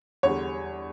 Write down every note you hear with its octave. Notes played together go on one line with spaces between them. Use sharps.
E2 D3 G3 C#5